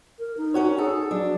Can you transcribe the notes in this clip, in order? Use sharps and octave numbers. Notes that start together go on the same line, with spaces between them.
A#4
D#4
C#4 F#4 C#5
G#4 A4
F#3 D4